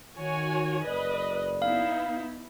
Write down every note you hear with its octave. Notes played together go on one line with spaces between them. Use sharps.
D#3 F#4 C#5 G#5
F#1 B4 D5 D#5
B3 D#4 E4 F5